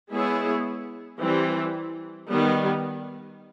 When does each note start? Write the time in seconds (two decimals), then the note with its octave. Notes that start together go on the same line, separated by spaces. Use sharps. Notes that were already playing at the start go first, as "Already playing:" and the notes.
0.11 G#3 B3 E4 G#4 C#5
1.20 E3 G3 C4
2.30 D#3 G3 B3